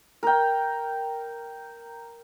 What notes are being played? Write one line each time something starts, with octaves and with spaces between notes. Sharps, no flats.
A#4 G5